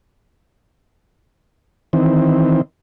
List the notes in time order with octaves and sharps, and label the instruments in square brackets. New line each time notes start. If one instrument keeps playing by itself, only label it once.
[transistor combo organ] D#3 E3 C4